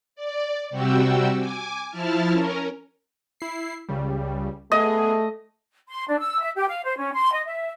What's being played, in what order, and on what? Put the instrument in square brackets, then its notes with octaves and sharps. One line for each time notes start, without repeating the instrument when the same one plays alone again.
[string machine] D5
C3 G3 F#4 G4 E6
G#5 D6
F3 E4 A5 F6
C#4 A#4
[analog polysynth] E4 C7
C#2 C#3 G3
[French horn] A3 [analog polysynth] B3 G#4 [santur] D#5
[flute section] C6
D4
E6
E5
G4
F5
C5
C#4
C6
D#5
E5